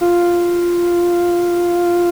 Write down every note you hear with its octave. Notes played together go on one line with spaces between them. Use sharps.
F4